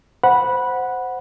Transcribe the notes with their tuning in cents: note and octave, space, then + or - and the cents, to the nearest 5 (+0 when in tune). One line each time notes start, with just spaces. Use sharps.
C5 -10 F#5 -5 B5 -15